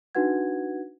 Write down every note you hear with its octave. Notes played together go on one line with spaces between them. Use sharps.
D4 D#4 F#4 B4 F#5 G#6